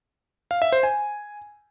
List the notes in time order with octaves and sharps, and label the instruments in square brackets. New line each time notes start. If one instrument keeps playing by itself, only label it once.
[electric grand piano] F5
E5
C5
G#5